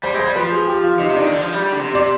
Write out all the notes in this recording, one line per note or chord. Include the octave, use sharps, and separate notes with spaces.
G3 C5
G#3
C5
G3
F3 B4
G#4
G4
F4
C3 D#4
C3
D#3 D4
D3
F3
G3
G3
D3
C3
C3 D5